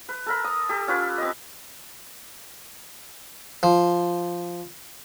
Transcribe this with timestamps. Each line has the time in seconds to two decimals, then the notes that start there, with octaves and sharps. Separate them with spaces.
0.09 B4
0.26 A4 A#4 B5
0.44 D#6
0.69 G4 A4
0.87 C#4 F4 B4
1.18 C4 D#5
3.63 F3